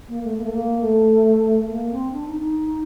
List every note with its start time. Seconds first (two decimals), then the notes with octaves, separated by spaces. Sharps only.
0.08 A#3
0.23 A3
0.37 A#3
0.44 A3
0.52 A#3
0.81 A3
1.69 A#3
1.91 C4
2.12 D4
2.27 D#4
2.42 D#4